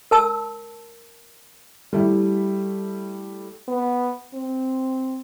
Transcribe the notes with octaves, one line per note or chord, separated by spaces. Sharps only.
A#4 A5 E6
G3 A3 E4
B3
C4